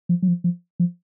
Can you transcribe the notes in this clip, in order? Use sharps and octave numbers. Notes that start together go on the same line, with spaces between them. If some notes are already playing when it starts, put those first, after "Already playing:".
F3
F#3
F3
F3
F3